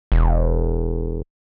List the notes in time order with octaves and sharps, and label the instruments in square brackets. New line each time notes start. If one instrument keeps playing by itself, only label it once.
[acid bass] E1